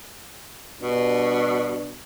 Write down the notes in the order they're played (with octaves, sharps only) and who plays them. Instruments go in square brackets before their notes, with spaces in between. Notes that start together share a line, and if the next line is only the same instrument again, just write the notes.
[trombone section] G2 D4 [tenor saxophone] B2